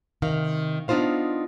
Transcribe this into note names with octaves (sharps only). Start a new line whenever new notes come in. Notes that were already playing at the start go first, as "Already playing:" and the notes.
C3 D#3 F5
B3 D4 D#4 F4 C5 F5